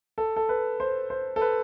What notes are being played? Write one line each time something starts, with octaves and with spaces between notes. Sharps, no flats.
A4
A4
B4
C5
C5
A4
B4